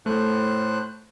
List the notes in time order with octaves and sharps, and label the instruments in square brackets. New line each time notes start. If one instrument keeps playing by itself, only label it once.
[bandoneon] A2 C5 F#6 [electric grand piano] A3